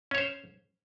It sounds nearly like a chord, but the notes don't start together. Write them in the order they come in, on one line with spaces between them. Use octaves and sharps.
C#4 C#5 C5